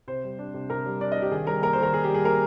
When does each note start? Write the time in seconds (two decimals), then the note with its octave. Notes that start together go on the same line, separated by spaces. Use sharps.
0.07 C3 C5
0.24 G3
0.39 D4
0.54 C3
0.70 C3 A#4
0.86 G3
1.01 D4 D5
1.12 D#5
1.17 C3
1.22 G4
1.32 D#3 G#4
1.47 G3 A#4
1.62 A#3 A#4
1.73 C5
1.78 D#3 A#4
1.94 D#3 G#4
2.04 G4
2.10 G3 G#4
2.25 A#3 A#4